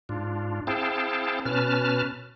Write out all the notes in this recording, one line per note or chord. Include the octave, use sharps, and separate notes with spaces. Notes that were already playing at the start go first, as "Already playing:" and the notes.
G#2 D4 F4
C4 E4 G#4 F5 G5 A5
B2 C#4 B4 A5 F6